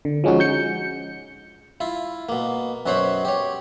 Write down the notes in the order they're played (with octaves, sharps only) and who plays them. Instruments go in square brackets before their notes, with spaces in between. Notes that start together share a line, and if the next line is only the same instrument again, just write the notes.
[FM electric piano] D3
F3 G#3 C#4 D#4 F#4
G6 C#7
[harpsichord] E4 F4
B2 A#3
F#2 B2 F#4 C5 C#5 B5
G4 C#5